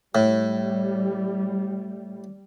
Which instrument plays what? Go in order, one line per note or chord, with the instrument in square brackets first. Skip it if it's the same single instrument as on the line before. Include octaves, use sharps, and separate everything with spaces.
[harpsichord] A2 [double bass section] G3